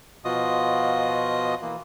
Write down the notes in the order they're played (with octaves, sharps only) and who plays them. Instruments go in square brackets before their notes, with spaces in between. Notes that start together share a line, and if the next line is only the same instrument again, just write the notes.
[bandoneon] B2 F3 F4 F#4 D#5 D#6
E3 A#3